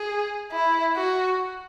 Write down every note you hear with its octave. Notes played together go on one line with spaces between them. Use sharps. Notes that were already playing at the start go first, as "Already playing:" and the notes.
Already playing: G#4
E4
F#4